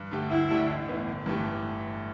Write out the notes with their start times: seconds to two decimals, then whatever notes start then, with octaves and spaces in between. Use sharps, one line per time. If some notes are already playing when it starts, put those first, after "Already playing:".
Already playing: G2
0.11 D3 A3 G4
0.30 D2 E4
0.50 D3 A3 D4 G4
0.69 A1
0.88 A2 E3 B3
1.07 G1
1.26 G2 E3 A3 G4